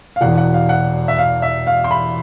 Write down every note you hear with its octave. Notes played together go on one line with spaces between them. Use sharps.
F5
E1 E2 B2 F#5
F#5
F5
F#5
E5
F5
E5
F5
C6
B5